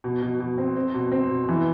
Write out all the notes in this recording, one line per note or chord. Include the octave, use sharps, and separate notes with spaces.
B2
B2
B2
C4
C4
B2
C4
B2
E3